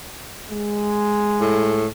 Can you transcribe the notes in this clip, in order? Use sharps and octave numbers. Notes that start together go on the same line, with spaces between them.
G#3
A2